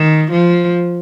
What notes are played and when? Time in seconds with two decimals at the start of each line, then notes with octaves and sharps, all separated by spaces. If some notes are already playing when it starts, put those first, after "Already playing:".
Already playing: D#3
0.31 F3